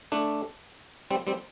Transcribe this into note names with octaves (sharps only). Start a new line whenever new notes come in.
A3 D4
G3 C4
G3 C4